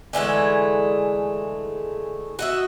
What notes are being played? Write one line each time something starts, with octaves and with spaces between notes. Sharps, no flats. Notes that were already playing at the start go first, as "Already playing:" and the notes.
D3 E3 G#3 A3
F#4 D#5 E5